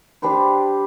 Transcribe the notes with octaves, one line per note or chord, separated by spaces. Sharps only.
D4 G4 B4 C5